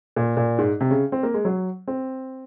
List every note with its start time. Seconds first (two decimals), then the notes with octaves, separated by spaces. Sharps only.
0.16 A#2
0.37 A#2
0.58 G#2
0.81 C3
0.91 C#3
1.12 C4
1.23 A#3
1.34 G#3
1.45 F#3
1.88 C4